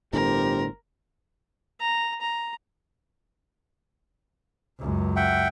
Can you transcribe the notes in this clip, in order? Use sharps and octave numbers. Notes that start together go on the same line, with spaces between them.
G1 A2 D3 G4 A#4 C5
A#5
A#5
C#2 F#2
E5 F#5 G5